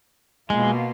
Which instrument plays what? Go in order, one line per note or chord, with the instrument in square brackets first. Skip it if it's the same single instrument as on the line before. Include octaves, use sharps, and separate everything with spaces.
[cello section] B2 A#3 F4 [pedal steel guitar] G#3